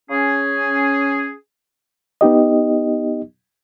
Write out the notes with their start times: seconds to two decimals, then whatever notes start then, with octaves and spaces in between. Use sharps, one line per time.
0.10 C#4 G#4
2.21 B3 D#4 G4 D#5